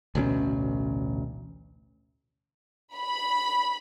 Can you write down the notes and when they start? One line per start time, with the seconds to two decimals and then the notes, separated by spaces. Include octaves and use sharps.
0.15 A1 D2 B2 C#4
2.95 B5